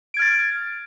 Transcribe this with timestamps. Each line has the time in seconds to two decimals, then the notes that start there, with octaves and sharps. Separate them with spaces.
0.14 D7
0.17 G#6
0.19 F6
0.22 A6